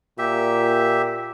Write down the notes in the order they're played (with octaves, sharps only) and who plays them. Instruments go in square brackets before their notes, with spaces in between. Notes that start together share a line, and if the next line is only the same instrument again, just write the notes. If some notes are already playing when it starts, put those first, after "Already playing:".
[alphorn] A#2 [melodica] G4 E5